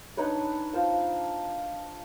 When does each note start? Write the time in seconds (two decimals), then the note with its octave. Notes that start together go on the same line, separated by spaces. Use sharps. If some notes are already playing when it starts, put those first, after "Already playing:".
0.17 D4 D#4 B4 C#5
0.73 F4 C5 A5